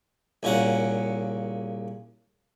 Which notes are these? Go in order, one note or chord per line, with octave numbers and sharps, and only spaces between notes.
C2 A#2 C#3 F#5